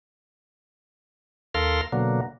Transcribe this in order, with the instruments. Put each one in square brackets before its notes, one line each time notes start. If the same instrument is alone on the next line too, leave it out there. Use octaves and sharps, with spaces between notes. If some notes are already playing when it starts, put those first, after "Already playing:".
[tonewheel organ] D#2 A4 A#4 F5 C6
B2 D3 F#3 A#3